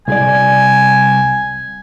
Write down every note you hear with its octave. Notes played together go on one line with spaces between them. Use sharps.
C2 G#4 D5 G#5